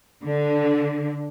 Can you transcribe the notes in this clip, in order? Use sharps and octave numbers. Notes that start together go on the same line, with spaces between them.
D3